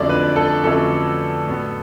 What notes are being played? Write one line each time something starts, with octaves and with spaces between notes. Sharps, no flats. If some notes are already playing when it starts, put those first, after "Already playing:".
Already playing: F2 D3 F#3 A3 C#4 D4 D5
B4
A4
F2 D3 F#3 A3 C#4 A4
A2 F#3 B3